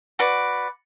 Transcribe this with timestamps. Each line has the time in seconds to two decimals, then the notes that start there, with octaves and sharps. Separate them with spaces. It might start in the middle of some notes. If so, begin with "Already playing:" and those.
0.19 F#4 B4 D5